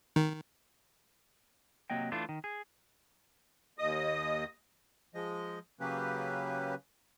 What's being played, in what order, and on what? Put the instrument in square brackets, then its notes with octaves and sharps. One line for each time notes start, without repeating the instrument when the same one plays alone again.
[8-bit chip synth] D#3
[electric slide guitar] C3 F#3 A#3 D#5 G5
E3 A3 D4 E4 F4
D#3
G#4
[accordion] D#2 D#5 D#6
F3 G#3 D#5
C#3 F#3 A#3 C#4 G4 B4